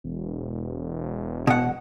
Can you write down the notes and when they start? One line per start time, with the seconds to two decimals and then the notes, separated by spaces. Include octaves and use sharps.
0.04 E1
1.47 B2 F#5